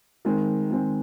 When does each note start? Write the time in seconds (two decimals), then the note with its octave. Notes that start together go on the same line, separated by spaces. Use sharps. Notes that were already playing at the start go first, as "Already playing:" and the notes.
0.25 D#3 G#3 C4
0.70 D#3 G#3 C4